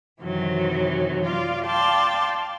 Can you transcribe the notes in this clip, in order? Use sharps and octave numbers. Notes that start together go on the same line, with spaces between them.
F#2 C3 D#3 E3 F#3
F4 D5 F5
D5 F5 G5 A5 C6